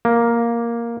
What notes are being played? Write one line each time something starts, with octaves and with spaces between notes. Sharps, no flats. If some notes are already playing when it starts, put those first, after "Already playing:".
A#3